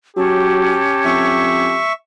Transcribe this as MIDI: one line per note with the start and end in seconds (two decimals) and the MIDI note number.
0.16 0.81 54
0.16 1.72 61
0.16 1.84 67
0.16 1.72 81
1.05 1.79 41
1.05 1.92 76
1.05 1.92 85